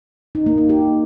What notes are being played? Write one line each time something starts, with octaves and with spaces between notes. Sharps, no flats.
D#4
A#3
D#4
G4